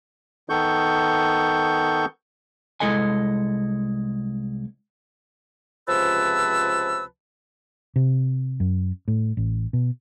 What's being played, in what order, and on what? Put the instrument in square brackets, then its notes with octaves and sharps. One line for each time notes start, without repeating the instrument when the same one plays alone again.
[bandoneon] D#3 B3 A4 C#6 G6
[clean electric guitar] C2 G#3 E4 A4 D#5 G#5
[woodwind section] C#2 C3 F3 B4 A5 E6
[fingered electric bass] C3
F#2
A2
A1
B2